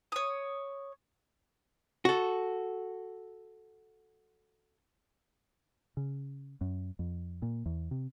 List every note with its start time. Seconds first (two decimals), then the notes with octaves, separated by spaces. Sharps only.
0.12 C#5 D#6
2.05 F#4 A4
5.97 C#3
6.61 F#2
6.99 F2
7.42 A#2
7.66 E2
7.91 C3